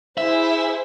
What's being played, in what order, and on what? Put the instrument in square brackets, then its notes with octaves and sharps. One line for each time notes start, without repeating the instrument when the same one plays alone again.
[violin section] E4 G#4 C5 [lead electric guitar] E5